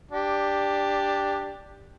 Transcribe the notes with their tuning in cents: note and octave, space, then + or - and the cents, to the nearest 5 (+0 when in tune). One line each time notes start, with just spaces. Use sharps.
D4 +0 G4 +10